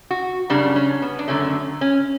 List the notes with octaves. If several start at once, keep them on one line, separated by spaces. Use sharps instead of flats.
F#4
F#2 C#3 G3 D4
C#4
B3
D4
F#2 D3 A3 C#4
C#4